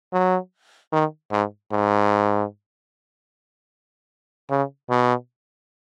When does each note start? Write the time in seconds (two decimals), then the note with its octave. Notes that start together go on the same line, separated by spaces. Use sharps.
0.13 F#3
0.92 D#3
1.31 G#2
1.72 G#2
4.50 C#3
4.90 B2